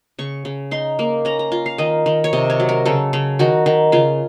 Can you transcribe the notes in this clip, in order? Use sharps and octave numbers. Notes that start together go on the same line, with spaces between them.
C#3 C#6
C#3
D#4 C6
A#3
C#4 A#5
A#5
F4
F5
D#3 D#5
D#3
C#5
C3 D#5
C#5
F#3
A#4
C#3 A4
C#3
D#3 F#4
D#3
C#3 F4